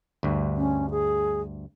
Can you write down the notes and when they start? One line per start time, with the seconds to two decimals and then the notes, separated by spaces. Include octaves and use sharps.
0.23 D2 G2
0.57 C#4
0.90 G#4